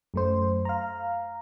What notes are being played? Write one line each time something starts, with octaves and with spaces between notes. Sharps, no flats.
F#2 A3 C5
F5 A#5